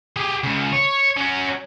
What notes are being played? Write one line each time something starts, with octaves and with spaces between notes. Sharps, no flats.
G4 G#4
C#2 C#3
C#5
C#4 F#4